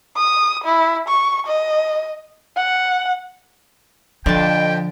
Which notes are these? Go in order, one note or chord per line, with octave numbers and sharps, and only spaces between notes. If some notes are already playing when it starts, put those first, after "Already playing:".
D#6
E4
C#6
D#5
F#5
F2 D3 F3 G5 A5